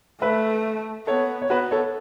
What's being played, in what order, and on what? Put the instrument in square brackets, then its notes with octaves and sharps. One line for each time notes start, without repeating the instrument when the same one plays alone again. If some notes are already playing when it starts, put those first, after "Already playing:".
[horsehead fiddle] A3 [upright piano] B4 E5
[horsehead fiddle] B3 [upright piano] A4 C#5
[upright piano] C#5
[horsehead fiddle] B3 [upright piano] F#4 B4
[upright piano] A4 C#5